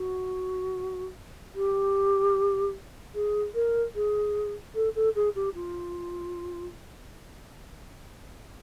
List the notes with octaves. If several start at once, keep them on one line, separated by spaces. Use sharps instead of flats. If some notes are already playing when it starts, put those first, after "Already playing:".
Already playing: F#4
G4
G#4
A#4
G#4
A4
A4
G#4
G4
F4